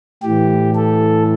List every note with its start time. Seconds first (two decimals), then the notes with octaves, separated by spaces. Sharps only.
0.23 A2 E3 G4
0.75 A4